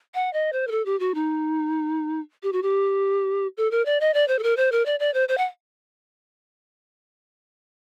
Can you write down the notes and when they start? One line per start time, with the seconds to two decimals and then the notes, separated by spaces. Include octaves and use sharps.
0.14 F#5
0.33 D#5
0.52 C5
0.67 A#4
0.71 A4
0.85 G4
1.00 F#4
1.15 D#4
2.43 G4
2.52 F#4
2.62 G4
3.57 A4
3.71 A#4
3.85 D5
4.00 D#5
4.14 D5
4.28 C5
4.39 A4
4.43 A#4
4.57 C5
4.72 A#4
4.86 D5
5.00 D5
5.14 C5
5.29 C5
5.38 F#5